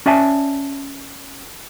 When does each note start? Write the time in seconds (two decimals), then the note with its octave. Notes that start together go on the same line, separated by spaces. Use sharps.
0.06 C#4 D5 E5 G#5 A5